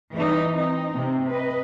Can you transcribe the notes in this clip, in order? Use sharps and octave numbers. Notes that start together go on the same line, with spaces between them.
E3 G3 D#4
C4 D#4
C3 C4
B4 D#5